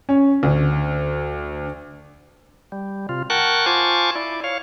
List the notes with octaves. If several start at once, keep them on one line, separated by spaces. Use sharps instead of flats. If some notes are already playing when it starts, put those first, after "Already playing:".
C#4
D2
G3
C3 F4
A#4 F#5 G5 A5 C#6 F#6
F4 C5 G#5 A5 C#6 D6
E4 D5
C#5 F5